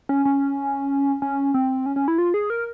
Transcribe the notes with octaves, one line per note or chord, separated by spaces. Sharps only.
C#4
C#4
C#4
C4
C#4
C#4
E4
F4
G#4
A#4